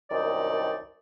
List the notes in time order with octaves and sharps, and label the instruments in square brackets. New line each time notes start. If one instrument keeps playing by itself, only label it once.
[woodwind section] C2 F#2 D#3 D#4 D5